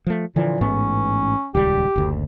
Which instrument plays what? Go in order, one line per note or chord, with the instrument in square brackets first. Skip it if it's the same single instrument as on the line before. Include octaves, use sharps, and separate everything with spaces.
[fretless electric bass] F3 A3
[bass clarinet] A#2 [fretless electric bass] D3 E3 F3
[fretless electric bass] A1 G#2 B3 [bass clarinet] C#4
[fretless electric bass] D#1 C#2 G3 [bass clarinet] G4
[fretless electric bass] F#1 D2